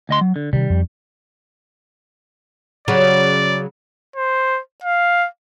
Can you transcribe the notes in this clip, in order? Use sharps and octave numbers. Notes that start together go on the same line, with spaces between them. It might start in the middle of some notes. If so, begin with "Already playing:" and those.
D2 D#5 C6
F#3
D3
C3 D#3 G3
F2
C#3 F#3 D5
C5
F5